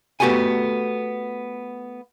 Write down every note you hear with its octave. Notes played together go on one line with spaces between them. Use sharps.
A3 B3 F#4 G4 A4 G#5